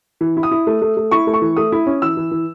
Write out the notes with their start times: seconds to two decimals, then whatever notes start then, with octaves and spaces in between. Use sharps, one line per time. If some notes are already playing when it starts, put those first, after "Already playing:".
0.21 E3
0.37 E4
0.43 D#6
0.51 E4
0.67 A3
0.82 A3
0.97 A3
1.11 E4 C#6
1.27 A3
1.34 C#6
1.42 E3
1.56 A3 D#6
1.72 E4
1.86 C#4
2.02 E3 E6
2.17 E3
2.31 E3